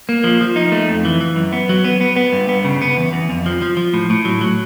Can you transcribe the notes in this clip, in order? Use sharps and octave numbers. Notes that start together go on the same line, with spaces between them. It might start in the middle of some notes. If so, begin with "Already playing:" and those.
A#3
F3
F3
D#4
A3
F2
E3
E3
F#2
B3
F#3
B3
B3
B3
G2
B3
C#3
B3
E2
E2
F2
F3
F3
F3
A2
A2
F#3
F#3